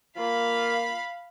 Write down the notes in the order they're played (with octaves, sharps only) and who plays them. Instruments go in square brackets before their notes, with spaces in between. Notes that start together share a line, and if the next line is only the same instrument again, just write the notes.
[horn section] A#3 F4 [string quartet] F5 B5